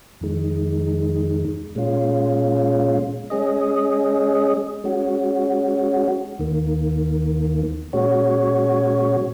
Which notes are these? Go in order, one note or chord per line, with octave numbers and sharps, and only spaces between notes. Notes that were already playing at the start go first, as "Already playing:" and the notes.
F2 D#3 G#3
A#2 G#3 C#4 F4
G#3 C#4 G#4 D#5
G#3 C#4 F#4
D#2 D#3 A#3
A#2 G#3 C#4 F#4 C#5